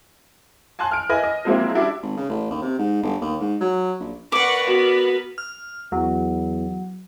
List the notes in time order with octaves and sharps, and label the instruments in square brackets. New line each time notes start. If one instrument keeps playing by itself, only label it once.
[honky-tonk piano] G#5 A5 C6 F#6
F6 D7
E4 B4 D#5 G#5
D#5
F3 F#3 G#3 A#3 C4 E4
G3 D4 E4 F#4
[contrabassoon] G#1
C#3
A1
D#2
C3
G#2
G1
D#2
G#2
F#3
A#1
[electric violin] A#4 B4 [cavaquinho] D5 D6 [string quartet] F#5 C#6
[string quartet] B3 [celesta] F#4
[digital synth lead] F6
[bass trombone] E2 [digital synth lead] F#3